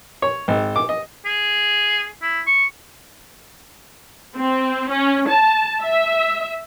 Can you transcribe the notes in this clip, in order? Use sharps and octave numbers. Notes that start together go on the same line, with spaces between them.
C#5
G#1
D6
D#5
G#4
E4
C#6
C4
C#4
A5
E5